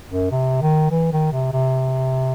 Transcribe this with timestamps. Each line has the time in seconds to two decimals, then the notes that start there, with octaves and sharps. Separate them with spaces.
0.10 F#2
0.31 C3
0.62 D#3
0.91 E3
1.13 D#3
1.32 C3
1.53 C3